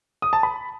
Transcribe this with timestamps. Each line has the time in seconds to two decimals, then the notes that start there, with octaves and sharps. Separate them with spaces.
0.22 D#6
0.33 A5
0.43 B5